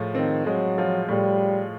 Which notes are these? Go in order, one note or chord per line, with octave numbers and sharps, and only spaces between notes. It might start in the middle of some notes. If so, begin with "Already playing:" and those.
Already playing: A2 F3 G#3
D#3 C4
F#3 G#3
F3
A2 G3